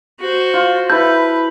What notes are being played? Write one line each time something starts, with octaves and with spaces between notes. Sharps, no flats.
F#4 C5
F4
E4 A4 B4 G6